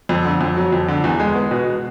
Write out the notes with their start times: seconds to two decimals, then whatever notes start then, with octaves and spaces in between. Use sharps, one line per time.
0.09 F2
0.25 D3
0.41 F2
0.57 F#3
0.73 F2
0.88 D3
1.04 E2
1.20 G#3
1.35 B3
1.51 B2